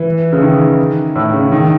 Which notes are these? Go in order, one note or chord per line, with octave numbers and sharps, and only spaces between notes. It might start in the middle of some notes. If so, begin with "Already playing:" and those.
Already playing: E3
C#3
D#3
A2
C#3
D#3